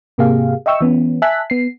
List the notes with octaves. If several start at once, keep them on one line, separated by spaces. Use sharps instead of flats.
G#2 C3 A#3 G4 G#4 F5
D#5 E5 G5 C#6 E6
E3 B3 C#4
E5 G#5 A5 F#6 B6
B3 C7